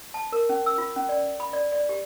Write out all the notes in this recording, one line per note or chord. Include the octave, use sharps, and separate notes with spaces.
A5
A#4
C#4
E6
F4
C#4
D5
B5
D5
D5
G4